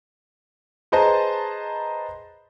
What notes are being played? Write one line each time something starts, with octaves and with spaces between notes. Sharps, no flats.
G#4 B4 C5 D#5 A5 A#5